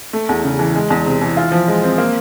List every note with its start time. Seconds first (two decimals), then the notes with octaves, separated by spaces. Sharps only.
0.13 A3
0.29 E2
0.44 C#3
0.59 E3
0.75 G#3
0.90 E2
1.06 C3
1.22 E3
1.37 F4
1.52 F3
1.68 G#3
1.84 C4
1.98 A#3